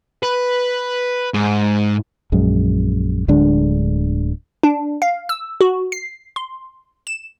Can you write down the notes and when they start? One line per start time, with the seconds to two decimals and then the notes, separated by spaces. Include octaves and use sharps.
0.23 B4
1.34 G#2
2.32 A#1 F#2 G#3
3.28 D1 D3 G#3 D4
4.63 D4
5.02 F5
5.29 E6
5.61 F#4
5.92 C7
6.36 C6
7.07 E7